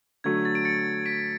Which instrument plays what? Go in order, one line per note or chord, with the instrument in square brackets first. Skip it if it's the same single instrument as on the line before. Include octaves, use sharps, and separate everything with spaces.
[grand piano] D3 F#3 A3 [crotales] G#6
[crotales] A6
D7
A6 C#7
B6 D7